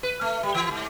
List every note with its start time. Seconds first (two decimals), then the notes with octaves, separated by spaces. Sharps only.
0.03 B4
0.21 A3
0.43 G3
0.55 E3
0.71 G#2